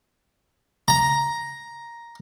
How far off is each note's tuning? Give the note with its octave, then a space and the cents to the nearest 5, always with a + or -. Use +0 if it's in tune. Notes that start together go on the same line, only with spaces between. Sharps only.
A#5 +5